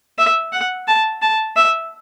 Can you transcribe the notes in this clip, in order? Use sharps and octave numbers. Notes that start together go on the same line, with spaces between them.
E5
F#5
A5
A5
E5